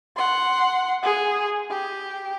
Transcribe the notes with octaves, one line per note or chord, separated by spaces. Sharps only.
F#5 C6
G#4
G4